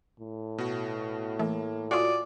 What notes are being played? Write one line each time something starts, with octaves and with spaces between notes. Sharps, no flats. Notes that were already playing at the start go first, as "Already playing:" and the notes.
A2
B2 F#4
E3 A3 A#3
F4 F#4 D5 G#5 D#6